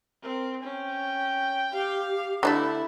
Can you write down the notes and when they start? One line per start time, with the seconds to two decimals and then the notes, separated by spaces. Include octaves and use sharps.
0.23 C4 A#4
0.63 C#4 G5
1.73 G4 F5
2.43 D3 G#3 A3 E4 A4